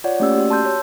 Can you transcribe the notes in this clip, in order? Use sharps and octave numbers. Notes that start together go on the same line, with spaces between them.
F4 C#5 D5 F#5
A3 A#3 C#4 G4 D5 E6
F#4 G4
A5 C6 E6 G6
C#5